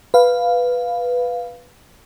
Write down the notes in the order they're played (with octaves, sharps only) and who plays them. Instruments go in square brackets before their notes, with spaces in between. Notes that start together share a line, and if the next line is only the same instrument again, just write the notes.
[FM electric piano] B4 F5